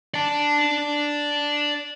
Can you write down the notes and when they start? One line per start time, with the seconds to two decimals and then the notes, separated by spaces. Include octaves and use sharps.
0.14 D5 A5